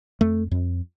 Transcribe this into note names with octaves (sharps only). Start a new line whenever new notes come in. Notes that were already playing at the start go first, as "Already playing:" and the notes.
F2 A3
F2